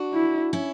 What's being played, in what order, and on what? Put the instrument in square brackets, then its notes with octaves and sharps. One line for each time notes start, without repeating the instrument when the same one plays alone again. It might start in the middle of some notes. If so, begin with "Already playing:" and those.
Already playing: [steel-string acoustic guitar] D4 F#4
[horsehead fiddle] E4
[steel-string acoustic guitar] C#4 E4